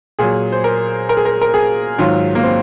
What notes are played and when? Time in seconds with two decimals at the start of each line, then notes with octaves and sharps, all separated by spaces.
0.19 A#2 F#3 G#4
0.52 C5
0.64 A#4
1.09 A#4
1.17 G#4
1.25 A#4
1.42 A#4
1.54 G#4
1.98 G#2 D#3 F#3 F4
2.35 A#3
2.44 C4